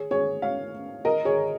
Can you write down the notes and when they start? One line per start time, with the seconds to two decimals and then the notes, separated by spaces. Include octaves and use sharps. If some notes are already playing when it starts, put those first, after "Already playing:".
Already playing: G#4 C#5
0.11 G#4 C#5
0.42 C#5 F5
1.05 A#4 D#5
1.25 G#4 C#5